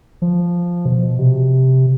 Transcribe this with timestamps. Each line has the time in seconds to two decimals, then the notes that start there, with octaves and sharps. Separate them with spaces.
0.22 F3
0.86 B2
1.18 C3